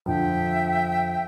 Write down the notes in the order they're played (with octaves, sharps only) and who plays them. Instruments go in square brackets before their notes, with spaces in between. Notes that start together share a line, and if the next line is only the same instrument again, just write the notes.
[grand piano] F2 D3 F3 [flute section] E5 G5